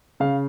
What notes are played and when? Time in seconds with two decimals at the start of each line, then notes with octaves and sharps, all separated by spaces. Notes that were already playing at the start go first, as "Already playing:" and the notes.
0.20 C#3 F5